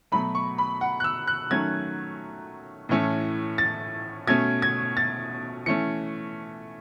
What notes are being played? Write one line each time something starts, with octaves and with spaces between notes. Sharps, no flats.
B2 F#3 A3 B5
C#6
B5
F#5
F#6
E6
F#6
D#3 F#3 A3 C#4 G#6
A2 E3 A3 C#4
A6
B2 A3 C#4 G#6
G#6
A6
E3 A3 C#4 C#7